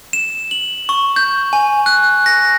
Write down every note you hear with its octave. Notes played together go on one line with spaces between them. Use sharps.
E7
F#7
C#6
G6
G#5
F#6
A#6